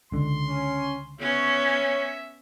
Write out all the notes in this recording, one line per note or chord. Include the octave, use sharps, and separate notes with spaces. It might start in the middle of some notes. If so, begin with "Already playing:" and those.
C#2 D3 C6
C#4
B3 C#4 C#5 E5